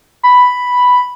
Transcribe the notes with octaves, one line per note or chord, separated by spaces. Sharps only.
B5